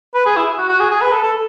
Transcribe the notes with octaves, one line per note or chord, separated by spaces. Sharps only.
B4
G#4
E4
F#4
F#4
G#4
G#4
B4
A4
A4